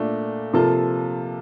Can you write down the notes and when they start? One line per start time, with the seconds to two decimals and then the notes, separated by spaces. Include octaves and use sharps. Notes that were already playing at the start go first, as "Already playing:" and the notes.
Already playing: A#2 A3 D4
0.53 C3 F3 A#3 F4 A4